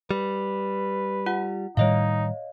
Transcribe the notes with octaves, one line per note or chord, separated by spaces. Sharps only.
G3 B4
F4 F#5
A2 D#3 G3 D#4 C#5 D#5 F5